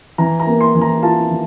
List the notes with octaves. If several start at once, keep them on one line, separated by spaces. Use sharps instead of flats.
E3 A#5
A#5
A#3
C6
E3
A#5
F4 A5
E3